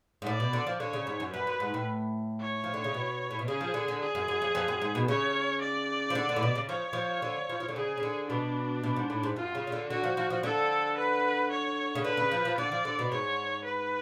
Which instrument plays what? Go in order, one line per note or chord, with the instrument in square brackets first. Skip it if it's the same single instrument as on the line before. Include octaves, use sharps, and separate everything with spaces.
[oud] G#2
[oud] A2 [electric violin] D5
[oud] B2
D3
F3
[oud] D3 [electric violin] C#5
[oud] C#3
G#2
F#2
[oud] F#2 [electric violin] B4
[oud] F#2
G#2
A2
[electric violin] C#5
[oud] F3
D3
C#3
B2
A2
B2
[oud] C#3 [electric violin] G#4
[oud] F3
D3
D3
[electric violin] G#4
[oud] F#2
F#2
F2
F2
F#2
G#2
B2
[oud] C#3 [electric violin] C#5
[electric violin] D5
[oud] F3
D3
D3
A2
B2
C#3
[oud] F3 [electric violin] C#5
[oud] F3
D3
F3
F3
D3
[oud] C#3 [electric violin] G#4
[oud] C#3
D3
[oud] B2 [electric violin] D4
[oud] B2
G#2
A2
G#2
[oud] F#2 [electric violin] F4
[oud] C#3
C#3
D3
[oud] D3 [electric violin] F#4
[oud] F3
F3
F3
[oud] D3 [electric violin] A4
[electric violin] B4
C#5
[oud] C#3
[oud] D3 [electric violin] B4
[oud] C#3
F3
F3
[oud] D3 [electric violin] D5
[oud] F3
D3
B2
[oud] G#2 [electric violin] C#5
[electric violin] B4